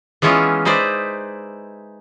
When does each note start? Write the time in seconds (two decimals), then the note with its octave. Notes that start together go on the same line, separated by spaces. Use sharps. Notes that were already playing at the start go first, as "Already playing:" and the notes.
0.22 E3 G#3 B3 C#4 E4 F4
0.65 D#4 E4 B4 C5 D5